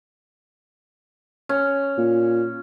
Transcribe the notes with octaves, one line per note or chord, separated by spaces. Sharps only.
C#4
A#2